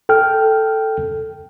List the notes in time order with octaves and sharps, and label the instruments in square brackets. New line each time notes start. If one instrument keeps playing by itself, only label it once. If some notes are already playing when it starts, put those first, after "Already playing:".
[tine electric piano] A4 G5 F6